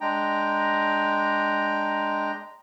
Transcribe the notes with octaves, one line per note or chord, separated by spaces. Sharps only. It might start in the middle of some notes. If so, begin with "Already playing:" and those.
G#3 D4 G5 A#5